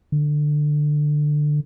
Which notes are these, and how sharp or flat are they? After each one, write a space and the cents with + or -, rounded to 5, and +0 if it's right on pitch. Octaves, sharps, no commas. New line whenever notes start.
D3 +15